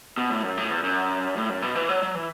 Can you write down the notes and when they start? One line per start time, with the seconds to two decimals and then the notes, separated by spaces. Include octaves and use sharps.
0.18 B2
0.30 A2
0.43 F#2
0.57 A2
0.70 E2
0.83 F#2
1.37 A2
1.50 F#2
1.62 B2
1.75 E3
1.89 F#3
2.03 F#3
2.15 E3